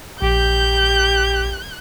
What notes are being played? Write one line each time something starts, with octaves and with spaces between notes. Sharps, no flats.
A#1 G4 G6